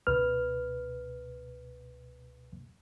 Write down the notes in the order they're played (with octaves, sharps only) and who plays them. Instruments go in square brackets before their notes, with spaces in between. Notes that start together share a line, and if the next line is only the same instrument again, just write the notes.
[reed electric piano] C#2 B2 B4 F6